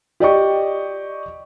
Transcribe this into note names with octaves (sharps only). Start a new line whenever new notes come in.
G4 D5 D#5 C#6